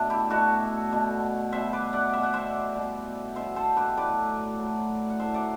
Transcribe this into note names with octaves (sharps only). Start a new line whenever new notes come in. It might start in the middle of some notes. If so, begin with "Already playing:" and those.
Already playing: B2 A3 D4 D5 E5
E4 G4
B2 A3 F#4 A4
B2 A3
B2 G3 C5 E5
B4 D5
D5 F#5
B2 G3 E5
F#5
C5 E5
B2 G3
B2 G3 C5 E5
A4 C5
G4 B4
A2 F#3 A3 B4 D5
A2 F#3 A3
F#5
A2 F#3 A3 C5 E5
D5 F#5